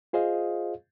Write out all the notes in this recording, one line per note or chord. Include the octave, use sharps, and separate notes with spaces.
F4 G#4 C5 D#5 F5